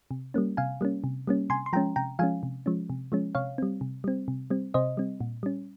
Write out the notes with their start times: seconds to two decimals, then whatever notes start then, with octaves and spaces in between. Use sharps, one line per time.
0.11 C3
0.34 G3 A#3 C#4
0.57 C3 F5 G#5
0.81 G3 A#3 C#4
1.04 C3
1.27 G3 A#3 C#4
1.50 C3 G#5 C6
1.66 C6
1.73 F3 G#3 C#4 G5 A#5
1.96 C3 G5 A#5
2.19 F3 G#3 C#4 F5 G#5
2.43 C3
2.66 F3 G#3 C#4
2.90 C3
3.12 F3 G#3 C#4
3.35 C3 C#5 F5
3.58 G3 C4
3.81 C3
4.04 G3 C4
4.28 C3
4.50 G3 C4
4.74 C3 C5 D#5
4.97 G3 C4
5.21 A#2
5.43 G3 C#4